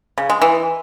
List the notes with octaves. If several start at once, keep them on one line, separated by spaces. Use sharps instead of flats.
C#3
G#3
E3